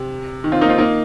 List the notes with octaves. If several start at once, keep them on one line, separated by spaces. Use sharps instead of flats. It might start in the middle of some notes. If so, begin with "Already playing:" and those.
Already playing: C3
D#3
C4 F4
A#3 D#4
C4 F4
A#3 D#4